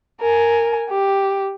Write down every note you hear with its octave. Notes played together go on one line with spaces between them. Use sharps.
A#4 G#5
G4